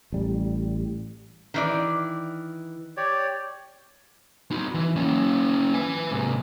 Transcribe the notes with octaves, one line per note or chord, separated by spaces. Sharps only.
A1 G3
D#3 E3 D5
G4 C#5 D5
D#4 F#4
E3
A#3 C#4
B4 G#5
G#2 C3